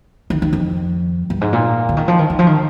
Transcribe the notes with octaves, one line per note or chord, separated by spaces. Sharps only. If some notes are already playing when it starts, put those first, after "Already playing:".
D#3
D#3
F2
G2
G#2
A#2
D3
D#3
F3
D#3
D#3
F3
D#3